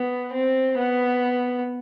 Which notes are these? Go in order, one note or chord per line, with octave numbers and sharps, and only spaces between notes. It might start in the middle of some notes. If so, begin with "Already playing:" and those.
Already playing: B3
C4
B3